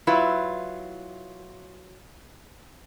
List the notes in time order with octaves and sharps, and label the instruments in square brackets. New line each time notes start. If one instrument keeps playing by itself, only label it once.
[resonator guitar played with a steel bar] F#3 E4 F4 B4 E5